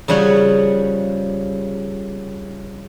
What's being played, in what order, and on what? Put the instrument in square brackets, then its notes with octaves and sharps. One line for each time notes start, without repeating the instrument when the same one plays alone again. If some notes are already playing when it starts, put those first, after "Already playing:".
[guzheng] C#3 F3 G3 C#5 F#5